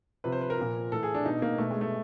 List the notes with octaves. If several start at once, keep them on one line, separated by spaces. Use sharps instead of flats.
C3 F3 B4
C5
B4
A#4
A#2 F3
A2 E3 A4
G#4
D4
B2 D#4
A#3
B2 A3
G#3
A3